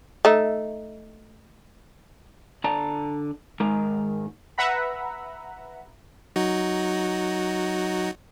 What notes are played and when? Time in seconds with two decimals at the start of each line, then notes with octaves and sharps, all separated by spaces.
0.25 A3 D#4
2.64 D3 D5 A5 A#5
3.60 G#2 D#3 G#3 A#4 A#5
4.58 B4 E5 F#5 A#5 B5
6.36 F#3 D#4 F#4